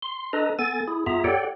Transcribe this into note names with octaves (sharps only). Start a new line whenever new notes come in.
C6
D4 A4 B4 D#5 A#5
B3 A4 G#5 A6
E4 G#4
G2 B3 F4 G#4 E5 A#5
G4 A4 C#5 D5 F#5 G5